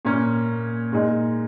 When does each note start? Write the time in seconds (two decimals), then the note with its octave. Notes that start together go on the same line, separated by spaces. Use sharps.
0.05 A#2 A#3 C#4
0.92 A#2 G#3 D#4 G#4